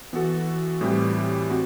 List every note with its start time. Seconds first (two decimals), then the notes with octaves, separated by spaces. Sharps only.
0.13 E3 B3 F#4 A4
0.81 A2 E3 G3 C4 G4
1.50 C4 F#4